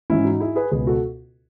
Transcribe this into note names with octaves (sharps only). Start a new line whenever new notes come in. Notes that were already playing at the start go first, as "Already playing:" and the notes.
G#2 E3 C#4 E4
D#4 F#4
E4 G#4
G#4 B4
C#2 B2 G#4 B4
F#4 A4